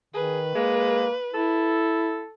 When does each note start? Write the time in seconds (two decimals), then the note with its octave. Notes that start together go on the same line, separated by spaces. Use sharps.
0.14 D#3 G#4 B4
0.55 G#3 A#3
1.34 E4 A4